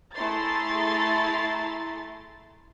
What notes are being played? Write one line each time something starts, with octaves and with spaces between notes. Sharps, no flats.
A3 E4 G#4 A#5 C6 A6